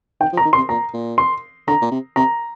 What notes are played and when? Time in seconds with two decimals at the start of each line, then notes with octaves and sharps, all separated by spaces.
0.21 D#3 G5
0.33 F3
0.37 A#5
0.45 D#3
0.53 C6
0.57 C3
0.69 A#2 A#5
0.94 A#2
1.18 C6
1.67 D3 A#5
1.82 A#2
1.91 C3
2.16 C3 A#5